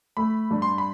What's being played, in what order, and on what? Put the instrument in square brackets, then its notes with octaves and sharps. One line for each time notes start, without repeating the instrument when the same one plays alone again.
[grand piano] A3 [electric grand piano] B5
[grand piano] G2
[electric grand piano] C6
B5